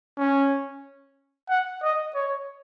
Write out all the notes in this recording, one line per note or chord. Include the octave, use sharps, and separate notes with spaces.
C#4
F#5
D#5
C#5